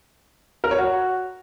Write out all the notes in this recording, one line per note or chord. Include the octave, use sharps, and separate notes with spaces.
A#4
C#5
F#4